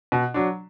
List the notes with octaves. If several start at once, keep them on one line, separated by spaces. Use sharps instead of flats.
B2
F#3 D4